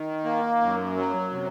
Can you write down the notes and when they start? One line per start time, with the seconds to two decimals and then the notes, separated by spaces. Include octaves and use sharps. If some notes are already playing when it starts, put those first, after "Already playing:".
Already playing: D#3
0.25 A#3
0.61 F#2
0.96 F#3
1.32 C3